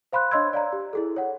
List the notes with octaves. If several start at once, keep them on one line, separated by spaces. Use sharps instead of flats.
C5 F5 B5 C6 F#6
D4 C#5 D#5 C6 E6 G#6
D5 F5 A#5
G4
E4 G#4 A4
C#5 F#5